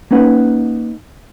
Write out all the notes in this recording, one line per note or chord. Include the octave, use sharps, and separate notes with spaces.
A#3 C#4 D#4 B4 F#5